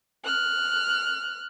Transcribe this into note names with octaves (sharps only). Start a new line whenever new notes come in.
F6 F#6